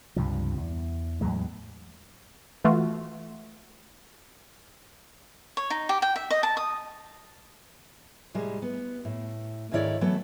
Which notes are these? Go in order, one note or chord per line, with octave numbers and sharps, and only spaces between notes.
C#2 G2 C3 F3
E2
E2 A2 F#3 G#3
E3 A3 F4 F#4
C#5
D#4
G4
G5
E5
D#5
A5
D#6
A2 C3 G3 G#3
B3
A2
D2 G#2 D#3 E4 C#5 D5
E3 F#3 A3 B3